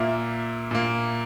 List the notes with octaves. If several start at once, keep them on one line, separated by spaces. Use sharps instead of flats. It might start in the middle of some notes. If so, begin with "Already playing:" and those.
Already playing: A#2 A#3 E5
A#2 A#3